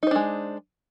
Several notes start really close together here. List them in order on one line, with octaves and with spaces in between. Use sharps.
D#4 C5 D4 G#3